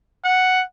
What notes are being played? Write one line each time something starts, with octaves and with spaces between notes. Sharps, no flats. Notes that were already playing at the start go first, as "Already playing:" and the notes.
F#5